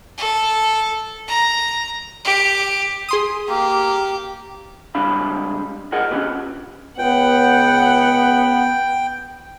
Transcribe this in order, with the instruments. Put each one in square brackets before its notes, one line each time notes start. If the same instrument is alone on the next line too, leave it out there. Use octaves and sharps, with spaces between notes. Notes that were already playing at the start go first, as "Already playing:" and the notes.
[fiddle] A4
A#5
G4
[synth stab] G#4 C6 D#6
[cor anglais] A#3 [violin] G4
[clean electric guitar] C#2 C3 G3 D4 F5 B5
F4 G#4 A#4 D#5 F#5
C3 C#4 D4 F4 G4 B4
[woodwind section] C#2 [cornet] B3 [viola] F#5 [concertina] G5